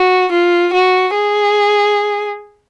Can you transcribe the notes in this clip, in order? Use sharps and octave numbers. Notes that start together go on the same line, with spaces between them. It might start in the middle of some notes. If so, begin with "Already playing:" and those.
Already playing: F#4
F4
F#4
G#4